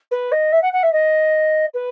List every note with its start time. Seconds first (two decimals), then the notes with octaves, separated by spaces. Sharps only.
0.11 B4
0.31 D#5
0.52 E5
0.62 F#5
0.72 F#5
0.83 E5
0.92 D#5
1.74 B4